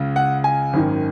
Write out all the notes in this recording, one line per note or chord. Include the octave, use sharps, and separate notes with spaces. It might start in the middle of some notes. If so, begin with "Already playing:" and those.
Already playing: C#2 C#3
F#5
G#5
G#1 F#2 D#3